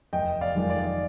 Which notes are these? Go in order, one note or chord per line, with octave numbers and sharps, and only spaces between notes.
F1 D#5 G5
D5 F5
F2 D#3 G#3
D5